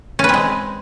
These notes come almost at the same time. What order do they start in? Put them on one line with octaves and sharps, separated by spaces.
C#4 B4 C4 G#3